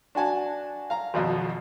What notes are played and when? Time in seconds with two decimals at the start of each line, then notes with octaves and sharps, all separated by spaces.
0.15 D4 F#4 G#5 A5
0.90 F5 A#5
1.14 G#1 F2 B2